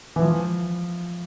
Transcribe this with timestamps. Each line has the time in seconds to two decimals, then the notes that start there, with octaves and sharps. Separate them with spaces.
0.16 E3
0.22 F3